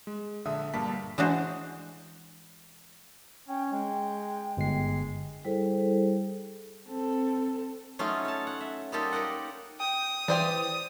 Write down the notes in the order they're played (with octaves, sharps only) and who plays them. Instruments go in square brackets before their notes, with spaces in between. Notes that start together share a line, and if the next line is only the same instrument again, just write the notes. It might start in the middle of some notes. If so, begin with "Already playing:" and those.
[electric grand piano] G#3
A#1 D3 E5 D#6
A#1 G2 A#3 A5 B6
[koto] E3 G#3 D4 F#4 C5
[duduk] C#4 [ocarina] G5
[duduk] G#3 [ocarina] G5
[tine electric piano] G1 C7 [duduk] G#3
[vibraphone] G3 E4 G#4 A4 C5
[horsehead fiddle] C4 A4
[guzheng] F#3 A3 C#4 D#4 F4
C#5 A5
F#5
E5
G3 A#3 D#4 F4 G4 A4
G4 A#4 D#5 F#5
[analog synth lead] G5 [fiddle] D#6
[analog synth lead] E3 [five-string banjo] G4 C5 D5